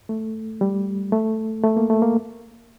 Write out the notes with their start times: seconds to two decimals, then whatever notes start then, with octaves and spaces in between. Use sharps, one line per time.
0.09 A3
0.61 G3
1.12 A3
1.64 A3
1.77 A#3
1.90 A3
2.02 A#3